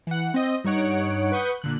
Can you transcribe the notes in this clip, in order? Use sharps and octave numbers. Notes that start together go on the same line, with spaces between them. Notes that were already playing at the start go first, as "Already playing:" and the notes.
E3 F#5
C4 D#5
G2 D#4 C#5 F#5 D7
B4 F#5 B5 C#6 D#6 G6
A#2 D3 F#6